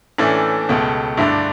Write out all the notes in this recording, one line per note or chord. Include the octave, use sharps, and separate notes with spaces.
A2 E3 A3 C#4 D4
C#2 B2 A3
G2 D3 A3 D4 E4